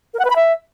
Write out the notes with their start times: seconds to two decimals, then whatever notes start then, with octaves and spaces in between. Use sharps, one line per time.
0.14 A#4
0.19 F#5
0.25 B4
0.30 B5
0.36 E5